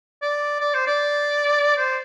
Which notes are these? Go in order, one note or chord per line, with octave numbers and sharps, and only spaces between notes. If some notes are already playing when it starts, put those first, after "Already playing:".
D5
D5
C5
D5
C5